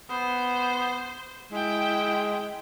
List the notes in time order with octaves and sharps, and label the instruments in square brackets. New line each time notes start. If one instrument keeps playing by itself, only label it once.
[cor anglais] B3 [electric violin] C5
[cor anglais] G#3 [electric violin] E4 G5